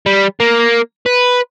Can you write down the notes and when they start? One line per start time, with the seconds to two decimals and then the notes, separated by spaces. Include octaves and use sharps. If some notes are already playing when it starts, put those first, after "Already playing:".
0.06 G3
0.40 A#3
1.06 B4